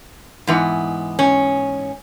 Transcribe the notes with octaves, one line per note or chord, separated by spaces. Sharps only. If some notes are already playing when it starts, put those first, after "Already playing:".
G#2 E3 B3
C#4